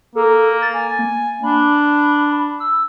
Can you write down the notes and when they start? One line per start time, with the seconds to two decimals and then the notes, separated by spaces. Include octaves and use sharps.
0.15 A#3 A4
0.62 A6
0.75 G#5
0.99 A#3
1.43 D4 B5
2.60 E6